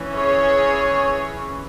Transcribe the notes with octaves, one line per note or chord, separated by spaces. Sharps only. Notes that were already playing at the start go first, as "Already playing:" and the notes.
Already playing: E3 C#4
G#4 C#5